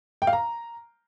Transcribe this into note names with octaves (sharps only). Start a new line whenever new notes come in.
G5
F5
A#5